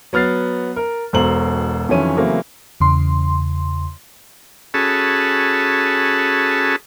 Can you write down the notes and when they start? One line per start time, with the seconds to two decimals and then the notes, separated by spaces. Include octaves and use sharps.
0.13 F#3 B3 F6 A6 C7
0.76 A#4
1.13 E1 B2 A4 C5 A#5 F#7
1.89 F2 D#3 E3 F#3 C#4 D#7
2.17 C#3 E3 F#3 A3 A#3 C4
2.80 E2 C#3 C6
4.74 C#4 F#4 G#4 A4 A5 B5